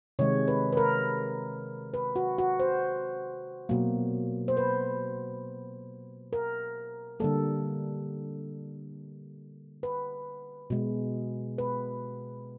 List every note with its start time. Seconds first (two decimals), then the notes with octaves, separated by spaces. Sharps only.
0.19 C3 D#3 G#3 C#5
0.48 B4
0.73 B4
0.77 A#4
1.94 B4
2.16 F#4
2.38 F#4
2.60 C5
3.69 B2 F#3 A#3
4.48 C5
4.57 B4
6.33 A#4
7.20 D3 G3 A#3 A4
9.83 B4
10.70 B2 G#3
11.58 B4